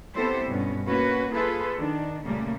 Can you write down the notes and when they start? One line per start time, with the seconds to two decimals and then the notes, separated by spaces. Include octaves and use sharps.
0.14 B3 C4 E4 G4 A4 C5
0.47 G2 B2 C#4
0.87 A#3 C#4 F#4 B4
1.32 F4 G#4 A4 B4
1.77 D#3 D4
2.25 A#2 C#3 G3 A3 A#3